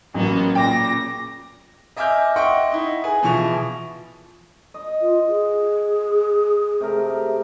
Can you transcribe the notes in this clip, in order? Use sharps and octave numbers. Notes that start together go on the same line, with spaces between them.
A1 F#3 A#3 B3
A#2 C#3 G5 D6 A#6
D#5 E5 G#5 D6 F6 G6
D#5 E5 F#5 G5 C6 C#6
D#4 E4
G#4 B4 G#5
B2 E3 F3 C#6 F7
D#5
F4
G#4
C3 A3 A#4